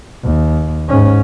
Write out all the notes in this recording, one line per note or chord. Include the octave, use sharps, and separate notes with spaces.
D#2
G#2 C#4